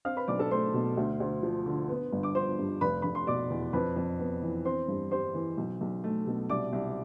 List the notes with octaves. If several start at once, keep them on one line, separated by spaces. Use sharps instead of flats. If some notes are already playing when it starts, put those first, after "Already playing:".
C4 F5 F6
B4 B5
B1 D5 D6
A4 A5
A3 C5 C6
B2
D2
D2
F3
D3
B3
G1
D6
F3 C5 C6
G2
F1 B4 B5
F1 B5
C6
B2 D5 D6
E2
F2 B4 B5
F2
B3
E3
C4 C5 C6
G2
G3 C5 C6
E3
B1
B1
A3
B2
C2 D5 D6
C2